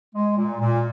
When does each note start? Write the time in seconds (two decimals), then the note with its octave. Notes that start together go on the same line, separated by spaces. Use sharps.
0.15 G#3
0.38 A#2
0.61 A#2